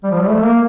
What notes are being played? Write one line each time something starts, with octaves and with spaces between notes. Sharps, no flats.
G3
F3
G3
A3
A#3